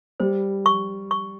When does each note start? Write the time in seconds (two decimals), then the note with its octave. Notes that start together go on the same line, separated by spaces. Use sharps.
0.20 G3 C5
0.66 C#6
1.11 C#6